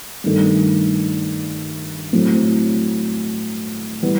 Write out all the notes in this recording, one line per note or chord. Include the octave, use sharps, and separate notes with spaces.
G2 D#3 A3
A2 F#3 C4
E3 G3 B3